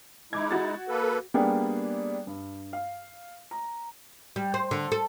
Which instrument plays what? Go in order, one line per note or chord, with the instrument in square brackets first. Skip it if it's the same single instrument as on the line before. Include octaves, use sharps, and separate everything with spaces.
[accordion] G#3 D#4 E4 [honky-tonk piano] D6 G#6
[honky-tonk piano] F#4 A6
[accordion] A#3 A4 B4
[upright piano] G3 A#3 B3 D4 G4 G#4
G2
F5
A#5
[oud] G3
C5
D3
A4